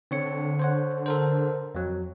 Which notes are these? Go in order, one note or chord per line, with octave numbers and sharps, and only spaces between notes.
D3 C4 C#5 C#7
C5 C#5 F#5
A4 A#4 C5
F2 F#3